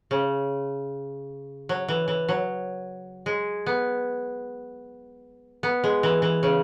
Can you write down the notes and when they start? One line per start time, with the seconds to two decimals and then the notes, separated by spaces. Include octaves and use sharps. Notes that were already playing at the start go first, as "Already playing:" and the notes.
0.11 C#3
1.69 F#3
1.88 E3
2.08 E3
2.29 F#3
3.26 G#3
3.66 B3
5.63 B3
5.84 G#3
6.03 E3
6.22 E3
6.43 C#3